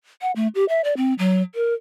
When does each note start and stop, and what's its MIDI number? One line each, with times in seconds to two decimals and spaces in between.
0.21 0.31 78
0.36 0.48 57
0.55 0.65 67
0.69 0.81 76
0.84 0.94 74
0.97 1.14 60
1.19 1.42 54
1.55 1.74 70